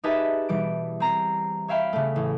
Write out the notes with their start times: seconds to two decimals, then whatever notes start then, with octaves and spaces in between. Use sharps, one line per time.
0.04 D#4 G4 G#4 B4 E5 A5
0.49 B2 E3 G3 D7
1.00 C4 A#5 C7
1.68 C#5 E5 F5 G5 B5
1.93 C#3 A3
2.16 A1